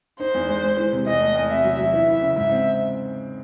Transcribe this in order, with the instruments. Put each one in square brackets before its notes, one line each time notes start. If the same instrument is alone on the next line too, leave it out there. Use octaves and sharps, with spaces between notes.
[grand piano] D#4 [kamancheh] C5
[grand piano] E2
G#3
G#3
E3
C3
[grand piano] E2 [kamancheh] D#5
[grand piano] A3
E2
[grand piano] C3 [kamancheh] E5
[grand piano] F#3
F#3
[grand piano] E3 [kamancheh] E5
[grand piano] E4
C#3
[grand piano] G#2 [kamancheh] E5
[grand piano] C4